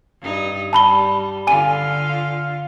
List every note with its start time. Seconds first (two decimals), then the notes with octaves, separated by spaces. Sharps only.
0.21 G2 D#4
0.73 G3 A5 B5 G7
1.47 D3 F4 G#5 D#7